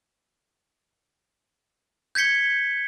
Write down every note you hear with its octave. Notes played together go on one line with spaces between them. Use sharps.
G6 G#6 B6 C#7 G7